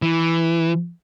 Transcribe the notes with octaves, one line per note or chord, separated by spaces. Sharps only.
E3